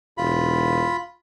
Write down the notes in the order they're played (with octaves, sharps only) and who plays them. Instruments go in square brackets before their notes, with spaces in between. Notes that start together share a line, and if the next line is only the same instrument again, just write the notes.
[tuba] E1 [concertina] F4 B5